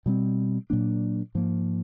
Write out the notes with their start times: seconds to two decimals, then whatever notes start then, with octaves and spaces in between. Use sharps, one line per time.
0.06 B2 G3 C4
0.70 A#2 F#3 A#3 D4
1.35 G#2 F3 A#3